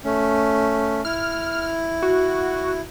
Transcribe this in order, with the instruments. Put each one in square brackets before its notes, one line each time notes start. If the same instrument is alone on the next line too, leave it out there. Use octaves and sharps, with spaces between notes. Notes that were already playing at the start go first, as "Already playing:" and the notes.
[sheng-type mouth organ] A3 C#4
[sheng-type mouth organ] E4 [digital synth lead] F6
[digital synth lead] F#4